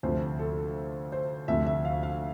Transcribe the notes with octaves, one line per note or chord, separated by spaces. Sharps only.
D2 C3 F3 C5
A4
C5
D2 C3 F3 E5
E5
F5
F5